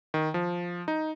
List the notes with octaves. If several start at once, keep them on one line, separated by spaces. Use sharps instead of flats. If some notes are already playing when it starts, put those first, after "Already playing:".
D#3
F3
D#4